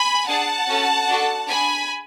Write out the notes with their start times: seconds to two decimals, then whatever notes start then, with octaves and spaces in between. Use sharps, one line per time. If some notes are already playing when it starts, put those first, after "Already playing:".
Already playing: G#5 B5
0.27 D4 G#4 F#5 A5
0.68 C#4 F#4 A4
1.08 D4 F#4 A4
1.48 D4 G#4 G#5 B5